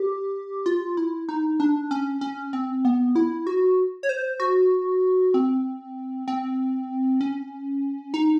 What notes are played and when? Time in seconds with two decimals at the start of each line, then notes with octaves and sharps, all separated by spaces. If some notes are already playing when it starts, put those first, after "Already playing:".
Already playing: G4
0.66 F4
0.97 E4
1.29 D#4
1.60 D4
1.91 C#4
2.21 C#4
2.53 C4
2.85 B3
3.16 E4
3.47 F#4
4.03 C#5
4.09 C5
4.40 F#4
5.34 C4
6.28 C4
7.21 C#4
8.14 D#4